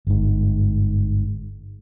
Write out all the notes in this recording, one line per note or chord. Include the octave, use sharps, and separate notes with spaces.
G1 G#2